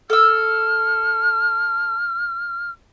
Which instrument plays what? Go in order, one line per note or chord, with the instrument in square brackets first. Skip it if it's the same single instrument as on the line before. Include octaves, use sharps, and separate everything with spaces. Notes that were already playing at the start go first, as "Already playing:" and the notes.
[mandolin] A4 E6 [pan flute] F6